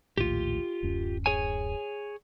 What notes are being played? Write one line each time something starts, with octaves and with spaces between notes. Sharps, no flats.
A#1 D#2 A2 F4 G4
D1 F#2 C#4
G#4 C#5 G#5